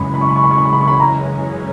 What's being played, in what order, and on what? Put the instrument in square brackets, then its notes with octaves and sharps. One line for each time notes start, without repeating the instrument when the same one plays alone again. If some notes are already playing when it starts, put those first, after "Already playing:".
Already playing: [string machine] F#2 C#3 E3 G#3 C#4 [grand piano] B5
[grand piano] B5
C#6
B5
C#6
B5
C#6
B5
C#6
B5
C#6
B5
A#5